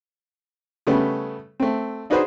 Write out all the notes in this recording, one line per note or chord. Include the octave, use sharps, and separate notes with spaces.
C#3 G3 A3 B3 C#4
A3 C4
D4 D#4 F#4 G#4 B4 C5